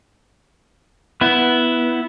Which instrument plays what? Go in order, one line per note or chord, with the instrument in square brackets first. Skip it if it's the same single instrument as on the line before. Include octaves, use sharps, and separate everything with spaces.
[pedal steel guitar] B3 [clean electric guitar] E4